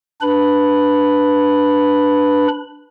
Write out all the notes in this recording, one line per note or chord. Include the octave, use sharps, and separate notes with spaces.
D4 B4 B5